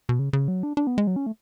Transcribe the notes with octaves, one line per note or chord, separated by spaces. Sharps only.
B2
C#3
C#3
F#3
D4
D4
B3
G#3
F#3
C#4
A3